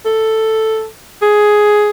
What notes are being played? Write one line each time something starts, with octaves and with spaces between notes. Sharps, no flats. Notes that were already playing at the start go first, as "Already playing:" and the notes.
A4
G#4